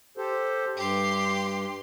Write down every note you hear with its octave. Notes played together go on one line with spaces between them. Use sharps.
G4 A4 C5
G2 G4 C6